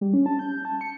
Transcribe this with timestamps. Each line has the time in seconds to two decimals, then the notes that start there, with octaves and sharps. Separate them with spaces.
0.01 G3
0.13 C#4
0.26 A5
0.39 G6
0.65 A5
0.81 C#7